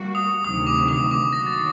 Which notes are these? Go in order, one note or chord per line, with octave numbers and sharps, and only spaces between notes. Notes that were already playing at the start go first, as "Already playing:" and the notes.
Already playing: G3 A#3 F#4
D#6
D2 C3 D#3 F#3 D#6
D6
D#6
D6
D#3 F#3 A#3 F#4 A#6
A6